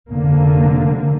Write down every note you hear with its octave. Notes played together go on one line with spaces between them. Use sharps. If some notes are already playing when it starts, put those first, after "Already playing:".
F1 D3 A#3